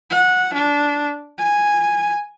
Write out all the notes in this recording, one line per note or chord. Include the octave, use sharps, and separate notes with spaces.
F#5
D4
G#5